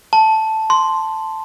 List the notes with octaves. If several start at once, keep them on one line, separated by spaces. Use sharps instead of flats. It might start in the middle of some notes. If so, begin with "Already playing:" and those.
A5
C6